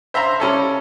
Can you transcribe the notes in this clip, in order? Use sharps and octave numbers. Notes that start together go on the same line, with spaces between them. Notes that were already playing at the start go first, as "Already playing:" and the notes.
C5 E5 F5 A#5 C6
G3 C#4 A4